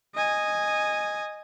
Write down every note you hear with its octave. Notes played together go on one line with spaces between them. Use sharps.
D#5 G#5